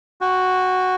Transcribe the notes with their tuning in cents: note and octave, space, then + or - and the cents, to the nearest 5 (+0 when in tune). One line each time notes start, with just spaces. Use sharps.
F#4 +0 G5 +40